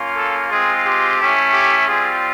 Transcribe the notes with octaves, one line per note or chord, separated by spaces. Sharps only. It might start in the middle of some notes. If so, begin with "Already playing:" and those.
Already playing: A#3 C#4 F4
A4
G#3 C4 F4 G#4
G4
A3 C#4 E4
G4
G3 C4 F4 G#4